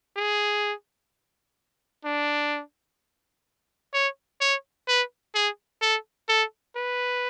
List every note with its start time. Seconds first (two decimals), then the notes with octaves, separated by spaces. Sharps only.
0.17 G#4
2.05 D4
3.94 C#5
4.41 C#5
4.88 B4
5.35 G#4
5.82 A4
6.29 A4
6.76 B4